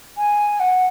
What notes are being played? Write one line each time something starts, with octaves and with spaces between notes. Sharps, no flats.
G#5
F#5